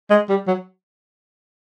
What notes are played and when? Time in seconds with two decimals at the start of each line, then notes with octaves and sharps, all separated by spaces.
0.10 G#3
0.29 G3
0.47 F#3